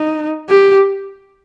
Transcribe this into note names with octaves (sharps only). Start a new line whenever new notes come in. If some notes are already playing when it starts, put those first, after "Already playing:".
Already playing: D#4
G4